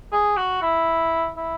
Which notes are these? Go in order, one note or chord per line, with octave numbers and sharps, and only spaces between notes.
G#4
F#4
E4
E4